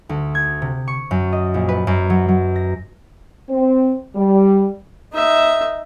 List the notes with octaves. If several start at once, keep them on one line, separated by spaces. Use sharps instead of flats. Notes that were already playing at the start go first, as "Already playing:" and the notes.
D2
G#6
C3
C#6
F#2
D#5
A#1
B4
F#2
F#3
F#3
A#6
C4 C5
G3
D#4 E5